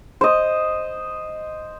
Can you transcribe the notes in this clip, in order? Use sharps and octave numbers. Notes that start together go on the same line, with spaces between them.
C5 D#5